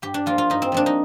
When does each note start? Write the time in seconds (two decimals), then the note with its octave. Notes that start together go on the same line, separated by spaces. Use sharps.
0.02 G2 G4
0.14 D4
0.26 F3 A#3 F4
0.38 F4
0.50 G2 D#4
0.62 C4
0.72 F3 A#3 D4
0.86 D#4